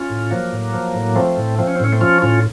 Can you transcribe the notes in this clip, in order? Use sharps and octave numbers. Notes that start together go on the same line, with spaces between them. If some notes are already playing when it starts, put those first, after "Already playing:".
Already playing: C#4 F4
A2
F3 F#3 A#3
A2
F3
A2
F3 A3 C4
A2
F3 C4
C#4
C4
A2 C#4
A3 C4
F3 C#4 F4
A2 C#4 F4